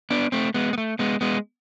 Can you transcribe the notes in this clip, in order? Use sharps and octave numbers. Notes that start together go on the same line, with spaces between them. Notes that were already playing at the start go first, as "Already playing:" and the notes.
B3 D4
A3 C4
G#3 B3
B3
A3
G#3 B3
G#3 B3